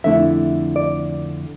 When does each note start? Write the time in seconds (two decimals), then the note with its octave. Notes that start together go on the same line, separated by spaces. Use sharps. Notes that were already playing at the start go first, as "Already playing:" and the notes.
0.04 F2 D3 A3 E4 E5
0.76 D5